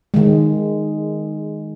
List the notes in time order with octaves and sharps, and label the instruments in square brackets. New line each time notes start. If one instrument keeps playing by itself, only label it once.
[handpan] D#3 G#3